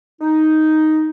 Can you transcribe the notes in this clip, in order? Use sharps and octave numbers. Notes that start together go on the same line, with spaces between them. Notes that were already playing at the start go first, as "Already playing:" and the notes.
D#4